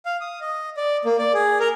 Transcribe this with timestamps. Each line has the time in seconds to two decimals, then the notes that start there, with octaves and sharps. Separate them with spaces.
0.06 F5
0.21 D#6
0.41 D#5
0.77 D5
1.05 A#3
1.19 D5
1.34 G#4
1.60 A#4